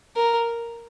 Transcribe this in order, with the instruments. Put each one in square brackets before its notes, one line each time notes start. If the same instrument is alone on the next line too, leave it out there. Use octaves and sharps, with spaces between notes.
[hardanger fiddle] A#4